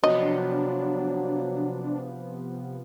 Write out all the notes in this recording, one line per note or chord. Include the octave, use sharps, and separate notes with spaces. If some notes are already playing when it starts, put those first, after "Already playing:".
C3 F3 F#3 B3 D4 D#5